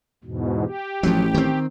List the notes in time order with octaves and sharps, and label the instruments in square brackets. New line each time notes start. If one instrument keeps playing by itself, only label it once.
[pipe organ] E2 G#2 B2
G4
[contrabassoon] A1 [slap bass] F3 F#3
[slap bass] D#3 C4